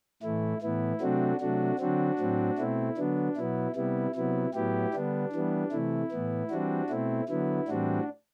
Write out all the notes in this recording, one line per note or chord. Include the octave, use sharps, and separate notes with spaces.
A2 E3 A3 E4
A2 E3 B3 E4
C3 F#3 A3 C4 D4 F#4
C3 F#3 A3 D4 F#4
D3 F#3 C4 D4 F#4
A2 F#3 C4
B2 A3 C4 E4
D3 F#3 B3 D4
B2 F#3 B3 E4
C3 G3 B3 E4
C3 F#3 B3 E4
A2 F#3 B3 E4 G4
D3 G3 B3 D4
E3 G3 B3
C3 E3 A3 E4
A2 E3 B3
E3 G3 C4 D4 F#4
B2 A3 C4 E4
D3 F#3 B3 E4
A2 E3 G3 C4 D4 F#4